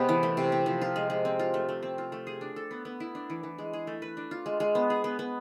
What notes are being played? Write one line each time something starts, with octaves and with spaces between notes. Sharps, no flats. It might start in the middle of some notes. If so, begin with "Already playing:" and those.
Already playing: C3 G#3 B3
E3
A3
C3
C4
F3
F4
G#3
G#3
C4
F4
A3
A3
C4
F4
A3
G#4
D4
A4
B3
B3
E4
D4
E3
E3
G#3
G#4
A3
B4
D4
F4
G#3
G#3
B3
G#4
B3
B3